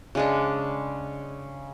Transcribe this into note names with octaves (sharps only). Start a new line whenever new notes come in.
C#3 G#3 D4